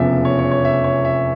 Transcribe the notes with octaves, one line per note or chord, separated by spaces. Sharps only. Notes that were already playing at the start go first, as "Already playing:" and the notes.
Already playing: F1 E2 C#3 F3 E5
C#5
C#5
C#5
E5
C#5
E5